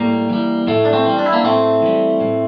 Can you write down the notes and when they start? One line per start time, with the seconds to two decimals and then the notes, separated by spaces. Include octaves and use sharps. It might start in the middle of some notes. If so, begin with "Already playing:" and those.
Already playing: A2 G3 A#3
0.29 E3 G3
0.67 A2 A3
0.85 D4
0.93 A3 C4
1.06 E3 G3
1.19 D4
1.26 E4
1.33 A#3 D4
1.44 A2 A3 C4
1.82 E3 G3
2.21 A2